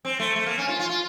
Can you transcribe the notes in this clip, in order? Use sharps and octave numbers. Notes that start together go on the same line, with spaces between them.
C4
A3
A3
A#3
C#4
F4
F4
F4